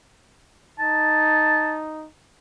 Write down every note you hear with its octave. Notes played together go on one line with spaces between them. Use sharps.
D#4 A5